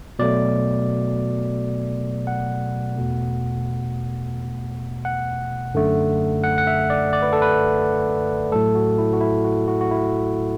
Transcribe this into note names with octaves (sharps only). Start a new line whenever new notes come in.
B2 F#3 A3 D5
F#5
E2 B2 A3
F#5
F#2 D3 A3
F#5
F#5
E5
D5
D5
B4
A4
B4
A2 F#3 A3 A4
F#4
E4
F#4
E4
F#4
F#4
F#4
E4